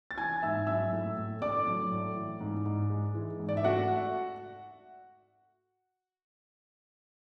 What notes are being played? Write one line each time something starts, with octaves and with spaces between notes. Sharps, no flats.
A6
E3 G#5 G#6
G#2 E5 E6
F#3 E5 E6
A2
A2
A3 D5 D6
F#3
A2
E3
G#2
G#2
G#3
E3
G#2
D5
E5
A3 F#4 F#5